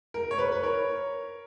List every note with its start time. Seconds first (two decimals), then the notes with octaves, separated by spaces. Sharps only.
0.14 A#4
0.31 C#5
0.38 B4
0.52 B4
0.63 A#4 C#5